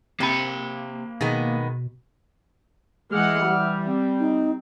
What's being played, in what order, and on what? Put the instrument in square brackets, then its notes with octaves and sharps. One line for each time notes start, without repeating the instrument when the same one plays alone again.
[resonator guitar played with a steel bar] C3 [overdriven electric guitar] A#3 B5
[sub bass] B2 [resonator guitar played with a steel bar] D#3 G#3 B3
[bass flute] E3 [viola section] G#3 F#5 [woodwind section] D6 E6 F6
[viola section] G3
[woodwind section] C4
[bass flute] D#4